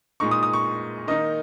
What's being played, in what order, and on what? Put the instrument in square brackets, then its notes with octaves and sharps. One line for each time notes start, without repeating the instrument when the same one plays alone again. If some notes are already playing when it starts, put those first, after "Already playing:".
[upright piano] A#2 G#3 D#4 C#6
D#6
D#6
C#6
D#3 A#3 D#4 D#5